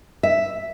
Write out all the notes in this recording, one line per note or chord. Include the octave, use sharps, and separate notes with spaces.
E5